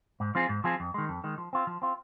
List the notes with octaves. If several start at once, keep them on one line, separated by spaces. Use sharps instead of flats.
G#2
F3 C4 F4 G#4
G#2
F3 C4 F4 G#4
F2
D#3 G#3
F2
D#3 G#3
F3
C4 F4
F3
C4 F4